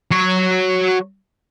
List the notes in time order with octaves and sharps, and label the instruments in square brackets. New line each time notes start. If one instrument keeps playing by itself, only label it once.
[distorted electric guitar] F#3 C#5